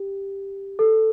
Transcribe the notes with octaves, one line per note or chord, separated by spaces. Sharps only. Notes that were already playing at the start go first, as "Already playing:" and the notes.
Already playing: G4
A4